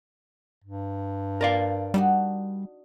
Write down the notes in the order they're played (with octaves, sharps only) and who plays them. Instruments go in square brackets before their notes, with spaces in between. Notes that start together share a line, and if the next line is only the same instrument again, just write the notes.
[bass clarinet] G2
[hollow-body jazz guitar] A#4 D5 F5
[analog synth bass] G3 [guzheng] D4 D#4 F#4